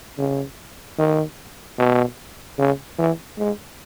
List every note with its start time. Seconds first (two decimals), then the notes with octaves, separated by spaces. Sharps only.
0.18 C#3
0.98 D#3
1.79 B2
2.58 C#3
2.98 E3
3.38 G#3